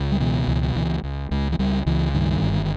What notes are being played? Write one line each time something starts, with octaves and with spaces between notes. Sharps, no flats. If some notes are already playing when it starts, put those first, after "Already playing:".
Already playing: C#2
G3
B2 E3
C#2 E3
C#2 E3
C#2
C#2 G#3
E3
C#2 G3
C#2 E3
G2 D#3
G1